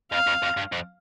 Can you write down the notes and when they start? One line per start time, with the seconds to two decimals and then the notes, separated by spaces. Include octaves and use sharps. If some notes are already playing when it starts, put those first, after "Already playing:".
0.12 F2 F5
0.27 F2
0.43 F2
0.57 G2
0.72 F2